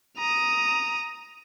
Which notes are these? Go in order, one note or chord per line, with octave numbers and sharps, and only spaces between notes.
A#5 D#6